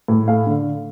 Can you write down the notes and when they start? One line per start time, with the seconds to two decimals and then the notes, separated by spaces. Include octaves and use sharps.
0.08 A2
0.28 A3 F5
0.47 D3